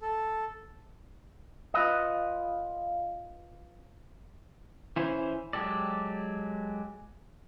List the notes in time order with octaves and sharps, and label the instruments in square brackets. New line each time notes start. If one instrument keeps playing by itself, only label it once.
[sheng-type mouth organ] A4
[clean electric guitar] F4 B4 D#5
[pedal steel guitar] E3 C#4 E4 C5
F#3 G#3 G4 A4 D5